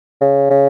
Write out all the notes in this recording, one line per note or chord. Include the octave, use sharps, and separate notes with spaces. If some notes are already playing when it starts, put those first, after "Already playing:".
C#3
C#3